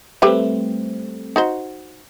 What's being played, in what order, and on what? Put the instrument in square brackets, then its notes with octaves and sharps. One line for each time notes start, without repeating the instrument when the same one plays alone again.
[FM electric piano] G3 A3 C4 [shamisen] G4 B4 E5
[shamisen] D#4 F#4 C5